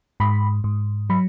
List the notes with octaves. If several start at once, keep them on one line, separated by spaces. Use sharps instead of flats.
G#2 B5
G#2
F#3 B5